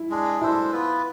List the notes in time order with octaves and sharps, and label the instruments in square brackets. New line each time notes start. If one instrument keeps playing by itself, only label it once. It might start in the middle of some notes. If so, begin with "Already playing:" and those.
Already playing: [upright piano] E4
[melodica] G#3 D4 G#4
[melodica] G#3 D4 A4 C5 [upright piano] E4
[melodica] B3 F4 B4